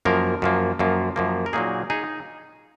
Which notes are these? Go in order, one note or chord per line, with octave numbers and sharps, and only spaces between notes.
F#2 F3 A#3 A#4
F#2 F3 A#3
F#2 F3 A#3 F4
F#2 F3 A#3
A#4
A#2 F#3 A#3 D#4 G#4
D#4 G#4